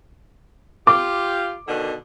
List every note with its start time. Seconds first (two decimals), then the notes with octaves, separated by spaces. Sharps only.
0.87 F4 G4 D6
1.67 B2 D3 D#3